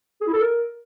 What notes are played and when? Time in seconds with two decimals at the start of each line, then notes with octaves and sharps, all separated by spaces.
0.21 G#4
0.27 E4
0.33 A4
0.40 A#4